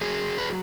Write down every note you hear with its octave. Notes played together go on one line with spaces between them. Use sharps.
F#3 G#4
B4